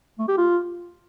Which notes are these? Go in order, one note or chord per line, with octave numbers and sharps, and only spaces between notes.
A3
G4
F4